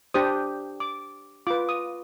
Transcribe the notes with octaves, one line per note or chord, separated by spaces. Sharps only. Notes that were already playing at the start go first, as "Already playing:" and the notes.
D4 G4 C5 D#6
D6
F4 B4 D6
D#6